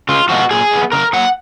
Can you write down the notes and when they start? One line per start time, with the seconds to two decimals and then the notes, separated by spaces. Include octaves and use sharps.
0.09 C#3 F4
0.29 F3 G#3 B3 F#4
0.51 A#2 G#4
0.71 G#3 B3
0.92 C#3 A#4
1.13 F#3 A#3 F#5